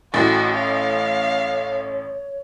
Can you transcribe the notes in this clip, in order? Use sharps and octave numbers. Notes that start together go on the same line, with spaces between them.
A1 A2 F#4 G5
C#5 F5